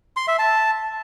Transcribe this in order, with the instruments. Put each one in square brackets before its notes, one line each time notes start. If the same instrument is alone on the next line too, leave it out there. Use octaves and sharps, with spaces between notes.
[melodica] C6
E5
A5